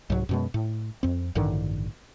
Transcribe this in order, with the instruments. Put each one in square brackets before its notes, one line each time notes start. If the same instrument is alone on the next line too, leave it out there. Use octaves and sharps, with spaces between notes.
[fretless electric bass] C2 G#2 F#3
F#2 B2 G#3
A2
F2 C4
A1 G2 D3 D#3